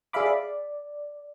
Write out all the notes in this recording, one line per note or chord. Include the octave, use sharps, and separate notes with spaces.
G#4 D5 E5 F5 B5 D6
D5